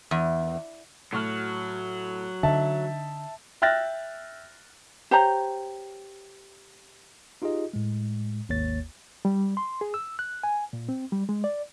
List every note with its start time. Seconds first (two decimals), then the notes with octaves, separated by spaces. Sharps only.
0.11 E2
1.13 A2 F#3 C#6 F6
2.43 D3 D#4 E5 A5
3.62 E5 G5 F6 F#6 A6 A#6
5.11 G4 C5 C#5 A#5
7.42 D#4 F4 G4 G#4 D#5
7.73 A2 G#3
8.49 G#1 D#2 A#3 C#5 A6
9.25 G3
9.57 C6
9.81 G#4
9.94 E6
10.19 F#6
10.43 G#5
10.73 A#2
10.89 C4
11.12 G3
11.29 G#3
11.44 D5